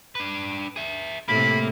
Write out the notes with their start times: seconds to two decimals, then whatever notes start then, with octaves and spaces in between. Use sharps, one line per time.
0.15 D4 B4
0.76 G#4 E5
1.28 A2 C3 A#3 B5